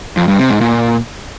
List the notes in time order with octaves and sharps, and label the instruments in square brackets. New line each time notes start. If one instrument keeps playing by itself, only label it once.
[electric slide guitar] F2
G2
C3
G#2
A#2